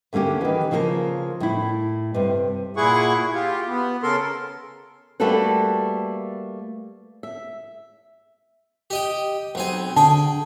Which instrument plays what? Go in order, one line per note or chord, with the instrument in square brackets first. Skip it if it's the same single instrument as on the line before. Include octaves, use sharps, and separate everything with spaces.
[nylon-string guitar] D2 D3 A#3 C#4 G4
D#3 E3
C#3 F3 A#3 G4 A#4
A2 E4
G2 C3
[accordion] A#2 E4 G#4 F#5 C#6
F4 G4
B3
C#3 A4 A#4 C6
[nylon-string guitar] G3 A3 A#3 F#4 A4 B4
E5
[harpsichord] G4 D#5 G5
B1 C4 G#5
[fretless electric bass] D3 [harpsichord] G#4 G5 [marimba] A5